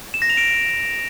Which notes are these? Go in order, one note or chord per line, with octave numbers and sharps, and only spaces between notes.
E7
A#6
F7
D7